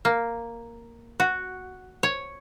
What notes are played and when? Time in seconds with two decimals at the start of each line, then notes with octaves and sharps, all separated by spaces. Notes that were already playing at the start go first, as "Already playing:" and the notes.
0.05 A#3
1.20 F#4
2.03 C#5